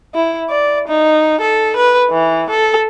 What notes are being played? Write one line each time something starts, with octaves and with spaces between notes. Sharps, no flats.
E4
D5
D#4
A4
B4
E3
A4